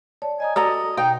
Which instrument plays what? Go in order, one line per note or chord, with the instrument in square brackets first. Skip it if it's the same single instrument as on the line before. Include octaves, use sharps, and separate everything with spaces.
[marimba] C#5 D5 A5
[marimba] D#5 A#5 D#6 [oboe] G#5
[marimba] F#4 [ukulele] A4 D5 A#5 [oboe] D#5
[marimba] B2 [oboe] D#4 [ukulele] G5